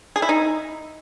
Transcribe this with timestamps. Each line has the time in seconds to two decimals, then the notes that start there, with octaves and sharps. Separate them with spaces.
0.16 G#4
0.22 E4
0.29 D#4